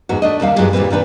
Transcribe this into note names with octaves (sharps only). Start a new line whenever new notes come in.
E2 G#2 F#4
A3 D4 D#5
D#2 C3 G3 F5
G2 E3 F#3 G#3
D#2 A#2 D#3 G3 C4 B4
A#2 D#3 D4 B4